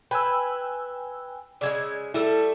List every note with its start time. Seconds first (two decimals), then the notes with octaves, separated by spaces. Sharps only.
0.11 B4 G5 G#5 E6
1.61 C#3 G3 G#3 D5 E6 G#6
2.14 G3 A3 E4 A4